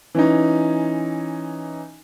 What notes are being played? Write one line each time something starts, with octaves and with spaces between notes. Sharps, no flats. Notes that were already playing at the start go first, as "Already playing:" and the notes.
E3 C#4 D#4